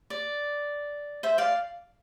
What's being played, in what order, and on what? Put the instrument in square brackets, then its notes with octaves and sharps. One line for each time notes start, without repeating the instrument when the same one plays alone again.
[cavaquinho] D5
C5 E5
D5 F5